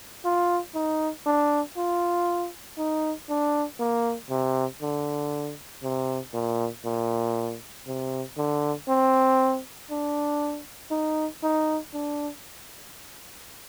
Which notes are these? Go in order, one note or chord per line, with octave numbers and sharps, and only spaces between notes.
F4
D#4
D4
F4
D#4
D4
A#3
C3
D3
C3
A#2
A#2
C3
D3
C4
D4
D#4
D#4
D4